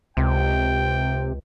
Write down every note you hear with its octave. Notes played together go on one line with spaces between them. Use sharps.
C#2 C3 G5